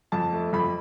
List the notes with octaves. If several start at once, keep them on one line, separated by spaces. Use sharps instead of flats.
F2 A5
A3
F2 B5